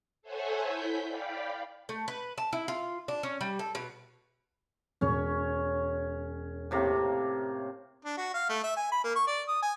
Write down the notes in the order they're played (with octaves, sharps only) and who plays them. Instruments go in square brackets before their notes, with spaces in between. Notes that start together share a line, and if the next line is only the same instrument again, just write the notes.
[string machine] A4 C5 C#5 E5 F#5 G#5
E4 G6 B6
D5 F5 G5 B5
[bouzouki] A3
B4
A5
E4
F4
D4
C#4
G3
A4
B2
[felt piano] E1 [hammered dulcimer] C#4 C#5
[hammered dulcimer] A2 C3 A#3
[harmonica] D4
F#4
F5
A3
E5
G#5
B5
A#3
C#6
D5
D#6
G#5